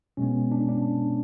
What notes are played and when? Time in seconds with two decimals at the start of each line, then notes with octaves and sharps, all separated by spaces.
0.17 B2 G#3 B3 C#4
0.52 D4
0.69 D4